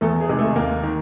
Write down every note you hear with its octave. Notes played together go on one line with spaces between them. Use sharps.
E2 A3 A4
G#4
C3 D#3 G#3
A3 A4
D#2 A#3 A#4
D#3